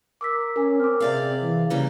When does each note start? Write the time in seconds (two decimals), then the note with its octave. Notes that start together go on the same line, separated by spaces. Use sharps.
0.21 A#4 D6 E6 B6
0.56 C#4 A#4 G#5
0.80 C4 D6 F6
1.00 C3 G#4 D5 F5
1.41 E3
1.70 C#3 E3 G3 A#3